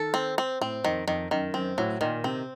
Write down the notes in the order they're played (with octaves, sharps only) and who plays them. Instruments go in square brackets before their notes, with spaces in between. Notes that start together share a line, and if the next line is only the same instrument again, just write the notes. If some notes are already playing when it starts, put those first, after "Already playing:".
Already playing: [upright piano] D#3 [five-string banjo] A4
[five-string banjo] C4
C4
[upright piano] A2 [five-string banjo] C4
[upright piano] F2 [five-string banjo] D#3
[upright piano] F2 [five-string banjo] D#3
[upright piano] F#2 [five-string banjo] D#3
[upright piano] F#2 [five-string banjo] C4
[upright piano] A2 [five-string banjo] F#3
[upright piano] A#2 [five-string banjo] D#3
[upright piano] C3 [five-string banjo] C4